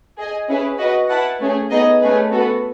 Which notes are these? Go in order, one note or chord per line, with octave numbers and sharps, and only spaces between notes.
G#4 D#5 G#5
C#4 E4 G#4 B4
F#4 B4 D#5
E4 B4 F#5 A5
A3 C#4 G#4
B3 D#4 G#4 D#5
A3 C#4 G#4 B4
B3 F#4 A4